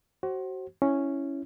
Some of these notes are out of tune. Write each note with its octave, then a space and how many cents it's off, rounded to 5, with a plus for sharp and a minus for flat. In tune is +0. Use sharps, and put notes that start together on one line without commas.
F#4 +30 C5 +30
C#4 +0 E4 +0